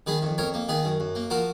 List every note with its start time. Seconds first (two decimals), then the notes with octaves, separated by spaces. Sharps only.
0.07 D#3 G#4 B4
0.22 F2
0.38 F2 A#4 C#5
0.54 A#3
0.68 D#3 G#4 B4
0.85 F#2
1.00 F#2
1.15 A#3
1.30 F3 F#4 A#4